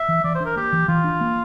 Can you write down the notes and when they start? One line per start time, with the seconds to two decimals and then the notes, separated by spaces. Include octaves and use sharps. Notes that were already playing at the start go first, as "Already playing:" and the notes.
Already playing: E5
0.08 E3
0.24 E3 D5
0.35 C5
0.40 D4 A#4
0.56 A#3 G4
0.73 E3
0.88 E3 F4
1.04 D4
1.21 A#3